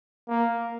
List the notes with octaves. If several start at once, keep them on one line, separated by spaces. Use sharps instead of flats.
A#3